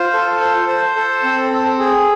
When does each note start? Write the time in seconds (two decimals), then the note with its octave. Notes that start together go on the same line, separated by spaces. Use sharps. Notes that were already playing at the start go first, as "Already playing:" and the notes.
Already playing: F4 C5
0.14 A4
0.40 C5
0.68 C5
0.96 A4
1.24 C4
1.51 C4
1.79 G#4